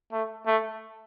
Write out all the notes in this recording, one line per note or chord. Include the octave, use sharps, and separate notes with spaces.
A3
A3